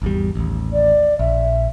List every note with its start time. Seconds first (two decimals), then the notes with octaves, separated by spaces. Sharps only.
0.02 G#1 E2 G3
0.35 A1 D#2
0.73 D5
1.19 A#1 E5